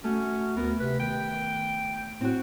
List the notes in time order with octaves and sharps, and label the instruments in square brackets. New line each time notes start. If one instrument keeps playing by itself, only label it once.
[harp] A3 [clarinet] C#4 [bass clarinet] F#4
[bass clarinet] D2 [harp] B3 [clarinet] A#4
[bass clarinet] C3 [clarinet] B4
[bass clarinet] D#3 [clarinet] G5
[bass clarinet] A2 [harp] C4 F#4